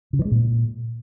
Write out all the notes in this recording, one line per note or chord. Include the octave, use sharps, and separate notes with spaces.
C#3
E3
G#3
A#2